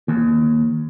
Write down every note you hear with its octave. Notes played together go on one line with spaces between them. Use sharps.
D#2